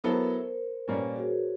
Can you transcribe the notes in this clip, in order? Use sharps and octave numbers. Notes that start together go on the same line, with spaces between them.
F#3 B3 E4 A4 A#4 C5
A#2 G3 A#3 C#4 B4 C#5
F#4 G#4